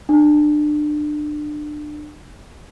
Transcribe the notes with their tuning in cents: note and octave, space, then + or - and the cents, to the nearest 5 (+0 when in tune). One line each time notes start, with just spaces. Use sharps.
D4 +30